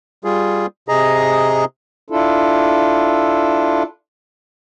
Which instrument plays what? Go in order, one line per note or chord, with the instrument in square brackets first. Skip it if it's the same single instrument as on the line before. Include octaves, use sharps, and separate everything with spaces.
[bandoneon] G3 F4 G#4
C3 G#4 D#5 A#5
[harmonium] D4 E4 F4 A4